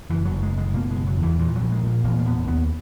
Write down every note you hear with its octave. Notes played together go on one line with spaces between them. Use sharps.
F#1 E3
F#3
F#1
G#3
F#1 G#3
B2 A#3
G#3
F#1
F#3
E2
E3
A#2 E3
F#3
A#1
G#3
A#2
A#3
E1 A#3
A#3
E1 B3
D#2 B3